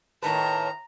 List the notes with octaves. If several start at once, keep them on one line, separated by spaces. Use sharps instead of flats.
A2 D#3 B4 A5 A#5